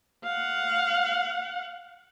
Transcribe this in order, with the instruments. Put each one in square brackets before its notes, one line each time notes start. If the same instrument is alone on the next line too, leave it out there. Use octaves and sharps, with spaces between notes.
[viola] F5 F#5